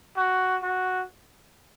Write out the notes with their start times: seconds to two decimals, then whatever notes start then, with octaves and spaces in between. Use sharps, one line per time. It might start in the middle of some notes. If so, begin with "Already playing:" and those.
0.17 F#4
0.63 F#4